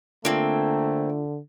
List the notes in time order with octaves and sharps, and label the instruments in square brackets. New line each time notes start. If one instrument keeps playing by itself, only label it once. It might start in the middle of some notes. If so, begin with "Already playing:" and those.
[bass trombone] D3 [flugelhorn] A3 [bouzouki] A#3 C4 [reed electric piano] D4 F4